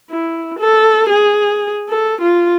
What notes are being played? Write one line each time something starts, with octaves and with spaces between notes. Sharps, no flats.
E4
A4
G#4
A4
F4